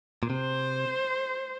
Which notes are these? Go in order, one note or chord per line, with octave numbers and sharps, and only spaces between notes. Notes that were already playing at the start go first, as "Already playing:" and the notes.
A#2
C3 C5